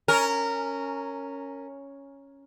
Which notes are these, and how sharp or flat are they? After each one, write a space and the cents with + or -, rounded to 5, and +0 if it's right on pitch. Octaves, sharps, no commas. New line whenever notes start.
C#4 +0 A#4 -15